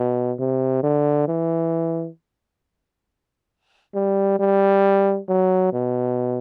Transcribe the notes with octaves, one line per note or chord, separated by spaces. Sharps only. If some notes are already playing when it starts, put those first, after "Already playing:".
Already playing: B2
C3
D3
E3
G3
G3
F#3
B2